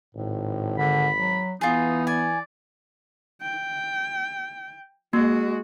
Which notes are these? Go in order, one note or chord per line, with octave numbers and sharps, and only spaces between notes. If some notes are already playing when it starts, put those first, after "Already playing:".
G#1 A2
D3 B5
F#3
E3 B3 D#4 F4 G#4
D5 G#5
G5
G#3 A#3 F#4